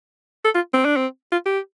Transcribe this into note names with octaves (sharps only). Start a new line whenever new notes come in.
A4
F4
C4
D4
C4
F4
G4